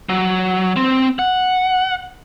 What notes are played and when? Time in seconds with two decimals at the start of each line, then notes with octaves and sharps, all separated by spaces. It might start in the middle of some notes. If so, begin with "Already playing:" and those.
0.09 F#3
0.76 C4
1.19 F#5